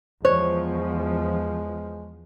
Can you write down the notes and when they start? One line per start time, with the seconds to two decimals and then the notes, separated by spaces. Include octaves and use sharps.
0.25 E2 F3 G#3 C5 C#5